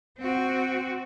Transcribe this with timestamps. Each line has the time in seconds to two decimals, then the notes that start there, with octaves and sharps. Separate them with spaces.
0.18 C4 F#4